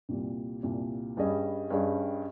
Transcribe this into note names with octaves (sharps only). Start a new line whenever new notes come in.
C2 A#2 G3
C2 A#2 G3
G2 G3 C#4 G#4 D#5
G2 G3 C#4 G#4 D#5